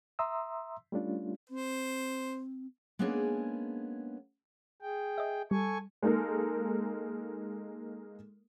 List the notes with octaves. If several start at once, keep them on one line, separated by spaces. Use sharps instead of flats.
E5 A#5 C6 D#6 E6
G3 A3 C#4 D4 F4
C4 C5
G#3 A#3 B3 C#4 D4 G#4
G#4 G5
D#5 E5
G3 A4 G#5 C#6
G#3 A#3 D#4 A4 A#4